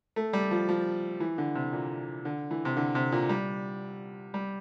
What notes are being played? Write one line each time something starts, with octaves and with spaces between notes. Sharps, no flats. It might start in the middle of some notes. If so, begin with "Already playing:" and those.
A3
G3
F3
F3
E3
D3
C3
A#2
D3
E3
C3
D3
C3
A#2
G3
G3